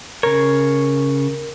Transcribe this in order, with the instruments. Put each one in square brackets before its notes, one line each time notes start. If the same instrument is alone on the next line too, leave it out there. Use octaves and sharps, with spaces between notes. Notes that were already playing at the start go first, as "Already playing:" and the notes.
[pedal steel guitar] C#3 C#5 [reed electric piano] A#4